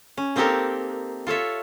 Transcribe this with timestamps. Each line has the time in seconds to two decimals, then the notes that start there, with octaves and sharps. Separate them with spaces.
0.17 C#4
0.36 A#3 C4 D#4 G4 A4 A#4
1.27 F4 A4 C#5 E5